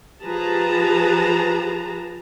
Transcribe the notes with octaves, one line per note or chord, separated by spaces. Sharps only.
F3 G4 G#4 B4 A5 A#5